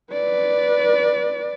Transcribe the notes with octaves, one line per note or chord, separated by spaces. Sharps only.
B4 D5